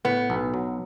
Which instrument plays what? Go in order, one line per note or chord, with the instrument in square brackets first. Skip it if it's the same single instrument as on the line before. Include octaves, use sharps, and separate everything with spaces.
[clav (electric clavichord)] A2 [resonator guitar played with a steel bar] B3
[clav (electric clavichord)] B1
F#3